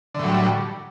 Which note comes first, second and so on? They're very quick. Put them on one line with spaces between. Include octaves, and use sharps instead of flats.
D3 A2 F#3 G3